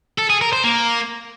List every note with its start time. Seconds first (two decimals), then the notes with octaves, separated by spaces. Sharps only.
0.19 A4
0.30 G#4
0.41 A#4
0.53 C5
0.64 A#3